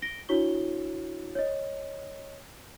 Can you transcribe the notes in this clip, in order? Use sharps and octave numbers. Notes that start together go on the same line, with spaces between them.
A#6 D7 G7
D4 E4 F#4 C#5 C#6 G7
C#5 D#5